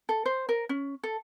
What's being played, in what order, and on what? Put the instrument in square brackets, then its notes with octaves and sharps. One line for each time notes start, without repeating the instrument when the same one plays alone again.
[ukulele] A4
C5
A#4
C#4
A4